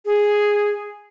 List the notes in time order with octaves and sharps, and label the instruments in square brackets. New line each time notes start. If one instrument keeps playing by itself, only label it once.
[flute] G#4